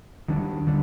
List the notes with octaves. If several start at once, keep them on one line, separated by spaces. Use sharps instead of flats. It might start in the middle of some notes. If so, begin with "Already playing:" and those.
D#2 D#3 G3 D4
D3 G3 D4